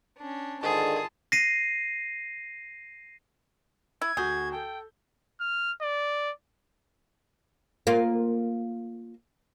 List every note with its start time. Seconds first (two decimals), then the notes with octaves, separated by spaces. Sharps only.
0.17 C#4 D4
0.63 G#2 D3 D#3 F4 G#4 A5
1.32 A#6 C7 D#7
4.02 E4 G#6
4.17 D2 F#4 G#4 G6
4.52 A4 G5
5.40 F6
5.82 D5
7.87 A#3 F4